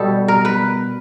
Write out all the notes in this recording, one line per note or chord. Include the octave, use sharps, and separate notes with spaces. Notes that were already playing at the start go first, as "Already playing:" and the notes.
Already playing: B2 G3 A4
A#4
B4